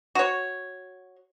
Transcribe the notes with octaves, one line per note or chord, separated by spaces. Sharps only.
F#4 C#5